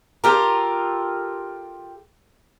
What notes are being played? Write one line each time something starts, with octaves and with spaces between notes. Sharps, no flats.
F4 G4 A4 A#4